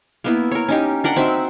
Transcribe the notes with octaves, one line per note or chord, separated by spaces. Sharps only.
A#3 B3 E4
A#4 C#5
C#4 D#4 G4
D4 A#4 F#5 G5
C4 D#4 F#4 E5